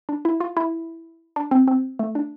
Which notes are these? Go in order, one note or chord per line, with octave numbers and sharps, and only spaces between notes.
D4
E4
F4
E4
D4
C4
C4
A3
D4